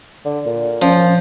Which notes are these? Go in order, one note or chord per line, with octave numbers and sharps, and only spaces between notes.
D3
A#2
F3 C#4